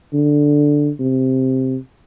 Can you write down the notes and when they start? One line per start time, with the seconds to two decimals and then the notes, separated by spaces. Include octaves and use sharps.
0.13 D3
1.00 C3